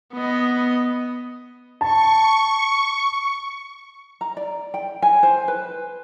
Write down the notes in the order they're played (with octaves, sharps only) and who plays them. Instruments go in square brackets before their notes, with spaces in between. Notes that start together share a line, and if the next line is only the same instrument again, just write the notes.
[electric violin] B3 D#5
[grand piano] A5 [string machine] C#6
[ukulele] A#5
D5
G5
G#5
C5
B4